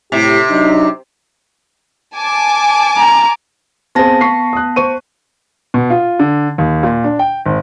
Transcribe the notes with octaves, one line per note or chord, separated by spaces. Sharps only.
A2 C3 G4
F#3 D4 D#4
G#5 A5 D6
A#5
B3 C4 G#4 C5 A5 A#6
C#6 B6 C7
D#6 F#6
C5 C#6 D#7
B2
F4
D3
D#2
A#2
D4
G5
G#1